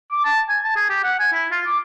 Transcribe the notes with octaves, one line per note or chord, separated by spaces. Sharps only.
D6
A5
G#5
A5
G#4
G4
F#5
G#5
E4
F4
D6